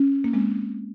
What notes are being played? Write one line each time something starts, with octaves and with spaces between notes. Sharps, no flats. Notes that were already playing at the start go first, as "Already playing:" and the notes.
Already playing: C#4
A#3
G#3 C4